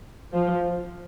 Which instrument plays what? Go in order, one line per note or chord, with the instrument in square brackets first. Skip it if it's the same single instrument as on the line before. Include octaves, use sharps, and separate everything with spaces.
[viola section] F3